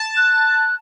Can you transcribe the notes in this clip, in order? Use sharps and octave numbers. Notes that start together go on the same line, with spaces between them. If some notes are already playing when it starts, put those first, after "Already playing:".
Already playing: A5
F#6